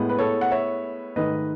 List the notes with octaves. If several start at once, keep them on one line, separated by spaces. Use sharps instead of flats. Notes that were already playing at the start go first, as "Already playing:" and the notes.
Already playing: A2 G#3 B3
B4
A4 C#5
F#5
C#5 E5
G#2 D#3 A3 B4 D#5